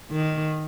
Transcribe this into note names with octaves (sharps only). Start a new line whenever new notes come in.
D#3